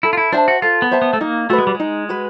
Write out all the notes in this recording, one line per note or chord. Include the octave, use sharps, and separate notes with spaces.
E4 A4
F4
E4
D4 C5 E5 A5
F#4
F4 A4
B3
C5 E5 A5
B3
A3
A#3 D#4
A3 F#4 B4
G#3
G3
G#3 D#4
F#4 B4